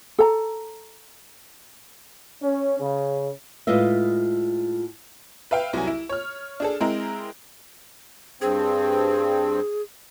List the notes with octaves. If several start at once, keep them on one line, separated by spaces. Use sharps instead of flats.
A4 A#5
C#4
C#3
A2 G#3 F4 B4 D#5 E5
B4 E5 F5 G5
C2 F#3 G#5
E4
C#5 F6
D4 G#4 A4
G#3 C4 E4 G#4 A#4
G2 C4 G#4